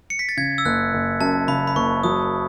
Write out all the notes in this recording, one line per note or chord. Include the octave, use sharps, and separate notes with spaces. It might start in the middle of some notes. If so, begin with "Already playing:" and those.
C#7
B6
A6
C#3 G#6
E6
F#1 F#6
F#1
F#2 A5
C#3 B5
B5
F#1 C#6
F#3 D#6